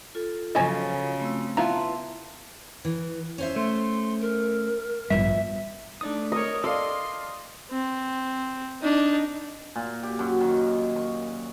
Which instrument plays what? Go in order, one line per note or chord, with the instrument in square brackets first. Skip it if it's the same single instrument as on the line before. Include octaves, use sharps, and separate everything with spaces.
[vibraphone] F4 A4
[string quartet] C#3 [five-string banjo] F3 F#3 [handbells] D#5 G#5
[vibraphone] A3 C4 E6
[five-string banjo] B3 E4 F4 [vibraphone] A5 C6 [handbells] A#5
[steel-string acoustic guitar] E3
C#4 C5 E5
[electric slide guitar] A3 [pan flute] C6
[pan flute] A#4
[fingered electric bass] A1 G2 G3 [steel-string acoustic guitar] B2 F3 [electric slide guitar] E5
[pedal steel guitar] A3 D5 D#6 [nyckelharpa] D4 D#4
[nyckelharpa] A#4 C#5 [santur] D#5
[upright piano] A4 D5 F5 [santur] D#5 [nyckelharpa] C6 [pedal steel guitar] D6 E6
[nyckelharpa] C4
D4 D#4
[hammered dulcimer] A#2
G4
F#2
D#3
C#6